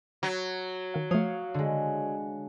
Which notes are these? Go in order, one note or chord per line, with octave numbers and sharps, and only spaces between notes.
F#3
D#3 F5
F3 A3 C#5 F5 D#6
D3 G#3